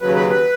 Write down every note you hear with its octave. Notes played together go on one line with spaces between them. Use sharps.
D#2 C#3 F#3 B4
B4
B4